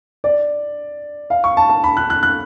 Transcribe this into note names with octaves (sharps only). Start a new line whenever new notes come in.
D5
F5
C#6
A5
A5
B5
F#6
F#6
F#6